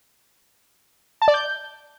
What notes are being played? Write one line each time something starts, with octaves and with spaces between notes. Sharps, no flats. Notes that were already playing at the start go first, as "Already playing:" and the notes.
A5
D5
G6